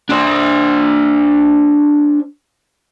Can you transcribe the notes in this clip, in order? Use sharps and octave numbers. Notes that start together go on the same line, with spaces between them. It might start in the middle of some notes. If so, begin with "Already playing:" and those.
D4 C5